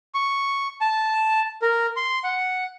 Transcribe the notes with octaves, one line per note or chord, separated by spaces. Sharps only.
C#6
A5
A#4
C6
F#5